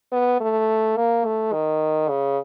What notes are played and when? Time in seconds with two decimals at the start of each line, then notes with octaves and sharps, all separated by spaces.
0.12 B3
0.40 A3
0.96 A#3
1.25 A3
1.53 D#3
2.09 C#3